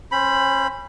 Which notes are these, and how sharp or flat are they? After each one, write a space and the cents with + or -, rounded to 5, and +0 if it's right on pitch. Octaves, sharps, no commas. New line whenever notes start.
C#4 -35 C5 +0 B5 +0